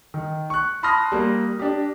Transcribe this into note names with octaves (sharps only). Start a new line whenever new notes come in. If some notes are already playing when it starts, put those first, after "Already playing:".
D#3
C#6 F#6
A5 B5 C6 D#6 F6 A#6
G3 A#3
D4 G4